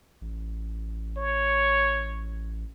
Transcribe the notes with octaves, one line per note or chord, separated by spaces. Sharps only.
A1
C#5